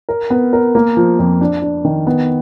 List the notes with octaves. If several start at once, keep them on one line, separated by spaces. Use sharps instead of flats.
A#4
B3
A#4
A#3
F3
F2
D4
D4
D#3
B3